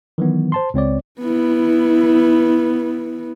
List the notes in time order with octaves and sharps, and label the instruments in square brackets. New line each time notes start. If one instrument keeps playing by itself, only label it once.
[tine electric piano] D#3 E3 F#3 B3
C5 A5 C6
C#2 C4 C#5 D5
[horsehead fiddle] B3 E4